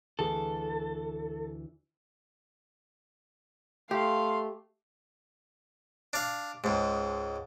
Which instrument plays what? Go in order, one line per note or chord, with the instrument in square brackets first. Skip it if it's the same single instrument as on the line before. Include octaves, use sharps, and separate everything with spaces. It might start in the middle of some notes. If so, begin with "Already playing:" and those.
[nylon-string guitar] D2 E3 G#4 [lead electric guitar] A4
[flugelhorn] A3 [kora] G4 [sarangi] F5 [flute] C6
[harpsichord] D4 F5
C#2 G#2